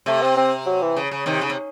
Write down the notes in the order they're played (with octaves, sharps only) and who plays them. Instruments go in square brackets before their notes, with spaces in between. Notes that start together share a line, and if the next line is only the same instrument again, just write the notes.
[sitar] C3 [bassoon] A3
[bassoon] C4
C4
F#3
E3
[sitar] C#3
C#3
C3 D#3
C#3
C3